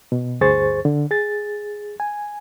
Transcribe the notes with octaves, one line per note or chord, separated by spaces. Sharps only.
B2
D2 G2 G#4 C5 C#6 A6
D3
G#4 A6
G#5